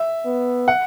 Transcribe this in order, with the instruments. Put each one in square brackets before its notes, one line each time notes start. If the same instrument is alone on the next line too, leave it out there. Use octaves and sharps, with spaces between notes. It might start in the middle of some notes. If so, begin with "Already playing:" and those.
Already playing: [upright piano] E5
[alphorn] B3
[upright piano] F#5